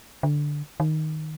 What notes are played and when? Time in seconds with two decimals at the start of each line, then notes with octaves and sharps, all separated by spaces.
0.23 D3
0.80 D#3